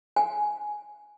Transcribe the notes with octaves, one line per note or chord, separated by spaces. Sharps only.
G#5